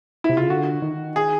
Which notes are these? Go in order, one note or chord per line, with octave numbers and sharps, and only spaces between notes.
E4
C3
C#3 F4
D3 F#4
D#3
G#4